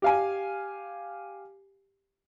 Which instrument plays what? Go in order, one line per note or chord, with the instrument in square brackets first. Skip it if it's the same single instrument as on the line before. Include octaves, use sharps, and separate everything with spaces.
[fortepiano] G4 F5 G#5